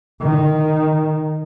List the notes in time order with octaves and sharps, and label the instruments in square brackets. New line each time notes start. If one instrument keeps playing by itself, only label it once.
[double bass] D#3